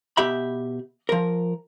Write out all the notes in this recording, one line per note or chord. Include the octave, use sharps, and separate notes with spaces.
B2 G4 E5 B5
F3 A#4